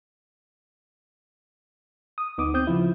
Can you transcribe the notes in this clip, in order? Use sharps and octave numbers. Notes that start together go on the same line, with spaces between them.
D#6
D2 B3 D#4 D6 D#6
C4 D#6 G6
C#3 F3 E4